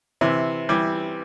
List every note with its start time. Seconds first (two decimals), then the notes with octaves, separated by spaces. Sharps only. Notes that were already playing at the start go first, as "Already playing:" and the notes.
0.21 C3 E3
0.69 E3 G3